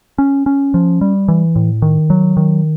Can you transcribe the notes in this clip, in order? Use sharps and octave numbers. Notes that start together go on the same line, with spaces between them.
C#4
C#4
F3
G3
E3
A2
D#3
F#3
D#3